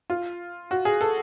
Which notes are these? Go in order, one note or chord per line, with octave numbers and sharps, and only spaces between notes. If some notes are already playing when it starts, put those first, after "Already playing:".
F4
F#4
G#4
A4